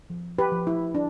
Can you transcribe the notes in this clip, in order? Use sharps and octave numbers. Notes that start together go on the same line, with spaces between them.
F3
G4 B4
F3
E4
D4